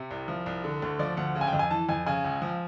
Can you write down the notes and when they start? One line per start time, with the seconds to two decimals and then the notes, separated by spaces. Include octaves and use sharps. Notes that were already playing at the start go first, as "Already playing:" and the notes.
Already playing: C3 E5
0.11 C2
0.28 F3
0.46 C2
0.64 D3
0.82 D2
0.99 F3 D5
1.17 D2 F#5
1.35 C#3
1.41 G#5
1.47 G5
1.53 F2
1.59 G#5
1.71 E3 A5
1.89 F2 G#5
2.06 C#3 G#5
2.24 C#2
2.42 F3